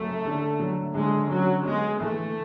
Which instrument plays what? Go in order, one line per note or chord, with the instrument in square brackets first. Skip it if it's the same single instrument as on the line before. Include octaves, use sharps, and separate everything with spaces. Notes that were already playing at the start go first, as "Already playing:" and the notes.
Already playing: [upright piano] F#2 C#3 F#3 [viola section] A3
[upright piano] D3
F#3
[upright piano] D3 [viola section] G#3
[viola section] F#3 [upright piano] C#4
[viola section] G#3 [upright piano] B3
[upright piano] E3 [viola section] A3